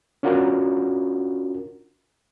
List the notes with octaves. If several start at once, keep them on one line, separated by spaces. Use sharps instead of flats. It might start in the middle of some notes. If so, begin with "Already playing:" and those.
C#4 D4 F4 F#4 A#4